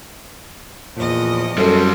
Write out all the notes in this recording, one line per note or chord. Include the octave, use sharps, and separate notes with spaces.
E2 A#2 F3 D#5
F#2 G3 A4 C5